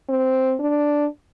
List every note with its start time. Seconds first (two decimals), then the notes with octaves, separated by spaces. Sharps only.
0.09 C4
0.60 D4